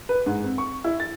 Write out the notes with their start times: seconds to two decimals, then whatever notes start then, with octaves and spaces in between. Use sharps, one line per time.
0.09 B4
0.26 G#2
0.44 C4
0.58 C#6
0.84 E4
1.00 A6